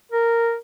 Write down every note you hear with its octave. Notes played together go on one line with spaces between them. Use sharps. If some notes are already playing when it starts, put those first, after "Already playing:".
A#4